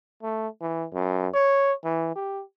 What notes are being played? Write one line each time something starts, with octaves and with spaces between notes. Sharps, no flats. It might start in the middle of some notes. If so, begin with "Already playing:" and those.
A3
E3
F#2
C#5
E3
G4